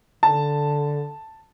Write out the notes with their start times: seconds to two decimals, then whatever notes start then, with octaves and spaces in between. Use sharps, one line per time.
0.23 D3 A5